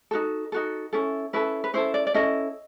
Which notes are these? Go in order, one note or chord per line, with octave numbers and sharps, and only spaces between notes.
D#4 F#4 A4
D#4 F#4 A4
C#4 E4 A4
C#4 E4 A4 B4
B4
C#4 E4 A4 C5
D5
D5
C#4 E4 A4 D#5